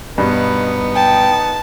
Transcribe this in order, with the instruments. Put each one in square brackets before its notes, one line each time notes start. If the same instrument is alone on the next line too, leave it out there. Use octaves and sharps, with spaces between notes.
[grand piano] G2 B2 [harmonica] B3 D#4 B4
[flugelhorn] G5 [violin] A5